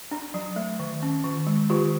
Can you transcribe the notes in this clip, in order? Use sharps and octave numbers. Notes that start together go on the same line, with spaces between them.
D4
F#3
A3
D#3
C#4
D#3
G#3
D#3 F4 G4